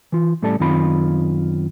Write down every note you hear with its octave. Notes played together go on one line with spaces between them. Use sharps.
E3 F4
A2 G3 C#4 A4 D5 A5
F#2 D#3 C4 F4 B5